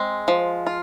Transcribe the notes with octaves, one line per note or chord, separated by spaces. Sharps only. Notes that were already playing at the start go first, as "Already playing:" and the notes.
Already playing: G#3 C4
F3
F4